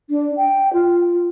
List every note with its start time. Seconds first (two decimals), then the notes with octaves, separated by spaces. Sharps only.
0.09 D4
0.36 G5
0.73 F4